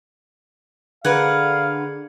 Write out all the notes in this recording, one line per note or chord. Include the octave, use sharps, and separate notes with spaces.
D3 G#4 A#4 B4 F5 F#5 G#6 C#7